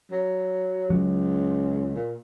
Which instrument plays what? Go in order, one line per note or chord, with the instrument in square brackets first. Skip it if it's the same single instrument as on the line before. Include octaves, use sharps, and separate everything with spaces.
[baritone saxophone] F#3
[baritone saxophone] C#2 [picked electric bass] F#3
[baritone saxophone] A#2